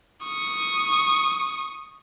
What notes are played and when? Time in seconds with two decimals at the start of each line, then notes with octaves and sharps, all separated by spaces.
0.24 C#6 D#6